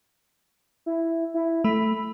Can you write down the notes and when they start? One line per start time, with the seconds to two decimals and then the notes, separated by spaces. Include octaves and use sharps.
0.86 E4
1.34 E4
1.64 A3 B5